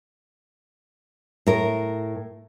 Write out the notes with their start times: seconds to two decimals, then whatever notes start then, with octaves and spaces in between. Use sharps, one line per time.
1.47 A2 A#4